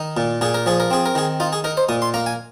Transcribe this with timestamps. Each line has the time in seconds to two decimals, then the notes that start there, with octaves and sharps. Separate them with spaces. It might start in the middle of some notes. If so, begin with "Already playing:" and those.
Already playing: D#3 D#4
0.17 A#2
0.41 A#2 G#4
0.54 A#4
0.66 F3 G#4
0.80 A#4
0.91 C4 G#4
1.06 A#4
1.15 D#3 G#4
1.40 D#4 F4
1.53 G#4
1.64 D#4 A#4
1.77 C5
1.89 A#2 D#6
2.02 C6
2.14 A#3 A#5
2.26 G#5